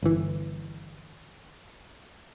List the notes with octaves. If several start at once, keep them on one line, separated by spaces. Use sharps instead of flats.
G1 E3